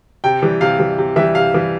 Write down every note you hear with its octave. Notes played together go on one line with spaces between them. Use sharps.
C3 G5
E3 G3
C3 F5
E3 G3
C3
E3 G3 E5
C3 F5
E3 G3